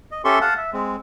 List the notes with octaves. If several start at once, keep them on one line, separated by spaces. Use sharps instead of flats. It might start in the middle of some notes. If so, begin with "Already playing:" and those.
D#5
C#4 G4 A4 E5 C6 C#6
F5 F#5 A5
E5
G#3 C4